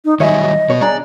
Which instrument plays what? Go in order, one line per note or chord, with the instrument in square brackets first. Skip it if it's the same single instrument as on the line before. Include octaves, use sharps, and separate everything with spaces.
[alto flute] D#4
[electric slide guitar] D#3 F#3 G3 [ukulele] C#5 E5 G#5 [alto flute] D#5
[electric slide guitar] B2 B3 [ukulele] C#5
[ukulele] D4 G#4 A#5 [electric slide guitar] D5